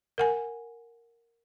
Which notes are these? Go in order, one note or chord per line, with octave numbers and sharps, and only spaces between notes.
A#4 F#5 G#5